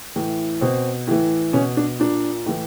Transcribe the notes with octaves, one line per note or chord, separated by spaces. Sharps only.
A2 E3
B2 C4
A2 E3
B2 C#4
D4
A#2 D4
A2 E3